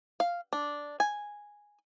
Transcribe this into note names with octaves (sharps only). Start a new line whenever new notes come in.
F5
D4
G#5